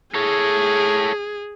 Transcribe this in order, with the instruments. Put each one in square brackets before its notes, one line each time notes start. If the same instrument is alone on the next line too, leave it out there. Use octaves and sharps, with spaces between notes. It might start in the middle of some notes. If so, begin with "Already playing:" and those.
[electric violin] G#4 [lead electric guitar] A4 C#5